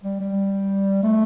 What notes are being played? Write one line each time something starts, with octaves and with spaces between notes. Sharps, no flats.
G3
G3
A3